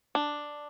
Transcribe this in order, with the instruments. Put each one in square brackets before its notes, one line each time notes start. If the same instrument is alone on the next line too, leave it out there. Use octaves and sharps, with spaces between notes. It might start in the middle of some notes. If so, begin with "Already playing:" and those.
[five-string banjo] D4